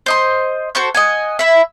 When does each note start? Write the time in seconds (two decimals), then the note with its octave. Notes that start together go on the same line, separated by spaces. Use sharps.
0.06 C5 D#5 C6
0.75 F#4 A4 C5 C#6
0.95 D#5 F#5 G#5
1.39 E4 E5